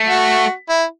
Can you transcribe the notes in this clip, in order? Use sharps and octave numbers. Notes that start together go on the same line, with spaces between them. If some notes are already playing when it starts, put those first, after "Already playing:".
Already playing: A3
F#4
E4